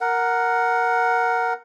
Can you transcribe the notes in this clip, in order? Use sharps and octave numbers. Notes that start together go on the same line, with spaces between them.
A#4 F#5